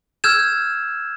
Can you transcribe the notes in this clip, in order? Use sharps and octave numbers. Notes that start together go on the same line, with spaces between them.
E6 F6 G6 G#6 E7